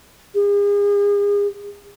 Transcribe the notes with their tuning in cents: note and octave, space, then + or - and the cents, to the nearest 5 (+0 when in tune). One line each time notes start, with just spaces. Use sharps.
G#4 -40